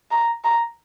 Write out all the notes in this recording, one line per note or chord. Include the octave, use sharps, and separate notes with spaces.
A#5
A#5